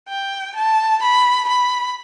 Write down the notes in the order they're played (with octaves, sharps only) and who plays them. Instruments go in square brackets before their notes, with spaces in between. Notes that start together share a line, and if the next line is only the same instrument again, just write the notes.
[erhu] G5
A5
B5
B5